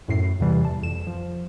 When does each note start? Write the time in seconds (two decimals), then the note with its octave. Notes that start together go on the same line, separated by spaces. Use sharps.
0.08 F#2 A2 C7
0.40 E2 C3 E3 G3
0.65 A5
0.83 F2 E7
1.07 F3